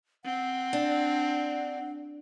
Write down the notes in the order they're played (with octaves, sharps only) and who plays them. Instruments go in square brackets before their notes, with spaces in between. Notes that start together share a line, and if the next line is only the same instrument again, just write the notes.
[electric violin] C4 [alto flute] F#5
[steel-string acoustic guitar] D4